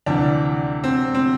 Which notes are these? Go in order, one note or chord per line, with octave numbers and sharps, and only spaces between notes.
D2 C3 E3 D4
C4
C4